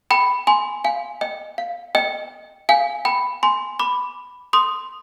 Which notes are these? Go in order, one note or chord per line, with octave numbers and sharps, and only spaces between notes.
G5 B5
G#5 C6
F5 G#5
D#5 G5
F5
D#5 G5
F5 G#5
G5 B5
G#5 C6
B5 D6
C6 D#6